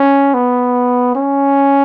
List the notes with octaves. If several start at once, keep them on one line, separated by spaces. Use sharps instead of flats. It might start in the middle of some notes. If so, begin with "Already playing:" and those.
Already playing: C#4
B3
C#4